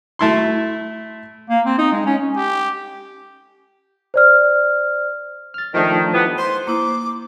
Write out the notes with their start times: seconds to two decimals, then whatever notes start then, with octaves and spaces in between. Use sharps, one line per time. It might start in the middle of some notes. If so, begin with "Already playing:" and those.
0.19 A3 E4 C6
1.50 A#3
1.66 C4
1.78 D#4
1.92 G#3
2.06 C#4
2.36 G4
4.14 C5 D5 F6
5.54 F6 A6
5.74 D#3 F3 A3 D4
6.14 E3 F3 B3 G4
6.38 C5 C6
6.67 A#3 E4 D6